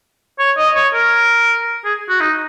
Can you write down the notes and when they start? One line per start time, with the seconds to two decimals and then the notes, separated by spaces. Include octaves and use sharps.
0.39 C#5
0.58 D#5
0.76 C#5
0.93 A#4
1.85 G#4
2.09 F#4
2.20 D#4